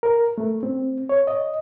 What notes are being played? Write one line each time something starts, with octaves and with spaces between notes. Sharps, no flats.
A#4
A3
C4
C#5
D#5